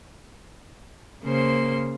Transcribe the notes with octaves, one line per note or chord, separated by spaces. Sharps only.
C#3 A#3 C5 C6